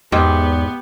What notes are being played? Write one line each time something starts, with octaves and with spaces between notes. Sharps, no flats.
E2 G#2 B3 G4